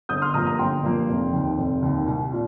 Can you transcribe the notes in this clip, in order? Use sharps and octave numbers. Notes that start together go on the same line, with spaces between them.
G1 D#6 G6
C6 F6
G2 F3 A#3 A#5 D#6
A#5 D#6
G1 G5 C6
G2 F3 A#3
F1
D#2 D#3
F1
D#2 D#3
C2
A#2